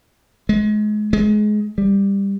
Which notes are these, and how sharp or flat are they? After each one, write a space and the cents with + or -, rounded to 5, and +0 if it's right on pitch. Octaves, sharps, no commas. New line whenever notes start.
G#3 +30
G#3 +25
G3 +15